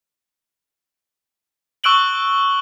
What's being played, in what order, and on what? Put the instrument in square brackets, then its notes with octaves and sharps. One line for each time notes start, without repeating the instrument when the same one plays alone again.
[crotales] C#6 E6 F#6 D7 F#7 G7